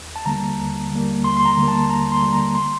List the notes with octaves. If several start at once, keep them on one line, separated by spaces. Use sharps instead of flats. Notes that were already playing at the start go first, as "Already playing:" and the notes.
Already playing: D#2
A5
D3 G3 A#3 A#5
D#2
D3 G3 A#3
D#2 C6
C6
A#5
D3 G3 A#3
A5
D#2 A#5
C6
D3 G3 A#3
A#5
C6